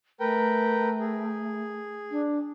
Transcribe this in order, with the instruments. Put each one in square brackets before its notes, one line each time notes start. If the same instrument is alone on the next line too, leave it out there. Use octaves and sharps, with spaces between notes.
[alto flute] A3 [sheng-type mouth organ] A#4 B4 G5
[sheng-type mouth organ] G#4
[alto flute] D4